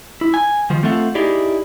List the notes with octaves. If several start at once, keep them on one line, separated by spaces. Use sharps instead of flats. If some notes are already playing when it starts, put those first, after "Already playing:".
E4
G#5
D#3 F3
A3 C4 F4 A4 E5 F#5
D#4 E4 G4 G#4 D5